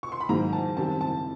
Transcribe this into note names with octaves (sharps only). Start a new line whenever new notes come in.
C#6
C6
B5
G#2 D#3 F#3 A#3 D#4 A#5
A5
F#2 D#3 G3 C4 A5
A5